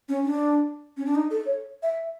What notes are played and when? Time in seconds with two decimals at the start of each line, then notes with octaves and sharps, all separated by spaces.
0.09 C#4
0.24 D4
0.97 C#4
1.05 D4
1.15 D#4
1.31 A4
1.46 C#5
1.83 E5